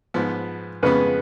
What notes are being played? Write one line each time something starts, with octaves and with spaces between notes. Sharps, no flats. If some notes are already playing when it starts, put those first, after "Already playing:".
G#2 F3 B3
F2 C#3 G#3 B3 B4